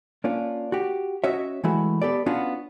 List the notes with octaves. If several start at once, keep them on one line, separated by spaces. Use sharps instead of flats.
A#3 C#4 D4 F4
F#4 G4
C#4 F#4 C#5 D#5 E5
E3 G#3 A3 E4 F#4
B3 G4 A4 D5
B3 C#4 D4 F4 F#4 F#5